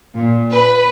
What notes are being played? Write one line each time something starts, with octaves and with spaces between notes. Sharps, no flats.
A#2
B4